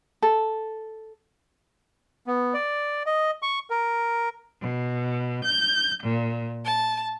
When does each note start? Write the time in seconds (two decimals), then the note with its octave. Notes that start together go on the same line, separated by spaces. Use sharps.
0.22 A4
2.27 B3
2.54 D5
3.06 D#5
3.42 C#6
3.70 A#4
4.60 B2
5.44 G6
6.02 A#2
6.64 A5